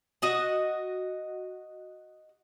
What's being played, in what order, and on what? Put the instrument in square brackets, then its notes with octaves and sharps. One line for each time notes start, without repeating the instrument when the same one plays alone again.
[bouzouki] F#4 D#5 F#5